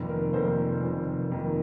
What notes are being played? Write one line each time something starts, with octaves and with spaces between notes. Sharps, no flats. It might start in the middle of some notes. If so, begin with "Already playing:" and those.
Already playing: F1 F2 D#3 A#3
A#4
F1 F2 D#3 A#3 A4 C5
F1 F2 D#3 A#3
F1 F2 D#3 A#3